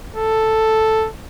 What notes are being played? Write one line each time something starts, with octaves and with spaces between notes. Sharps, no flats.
A4